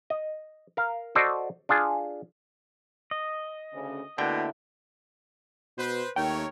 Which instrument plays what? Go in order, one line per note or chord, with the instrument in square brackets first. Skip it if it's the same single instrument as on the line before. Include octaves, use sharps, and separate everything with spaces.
[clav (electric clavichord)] D#5
A#4 F5
F#4 A4 C5 D5 D#5
D4 F4 G#4
[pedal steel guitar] D#5
[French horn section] D2 C#3
[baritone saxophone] B2 [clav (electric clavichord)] D3 G5 [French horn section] A3 A#3 E4
[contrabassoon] B2 [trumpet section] B4 C5
[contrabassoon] D#2 [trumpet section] A3 A#4 C#5 [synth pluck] G5